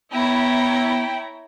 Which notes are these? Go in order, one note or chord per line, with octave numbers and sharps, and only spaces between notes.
B3 E4 C#5 G5 A#5